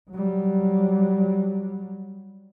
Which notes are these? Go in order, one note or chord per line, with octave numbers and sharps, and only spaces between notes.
F#3 G3